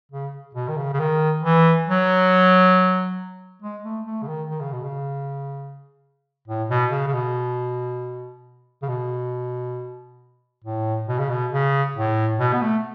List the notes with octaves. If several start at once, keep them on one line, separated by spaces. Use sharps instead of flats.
C#3
B2
D#3
C#3
C#3
D#3
E3
F#3
G#3
A3
A3
C#3
D#3
D#3
C#3
B2
C#3
A2
B2
C#3
C#3
B2
C#3
B2
A2
B2
C#3
B2
C#3
A2
B2
B3
A3